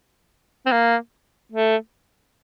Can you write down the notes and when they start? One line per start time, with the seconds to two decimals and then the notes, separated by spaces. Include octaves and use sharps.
0.66 C4
0.72 A#3
1.52 A3